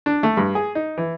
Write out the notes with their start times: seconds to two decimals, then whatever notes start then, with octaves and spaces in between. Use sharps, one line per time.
0.06 D4
0.23 A3
0.37 G2
0.55 G#4
0.75 D#4
0.98 E3